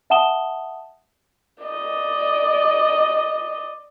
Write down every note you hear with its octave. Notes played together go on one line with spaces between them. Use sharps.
E5 F#5 A5 D#6 E7 G7
D5 D#5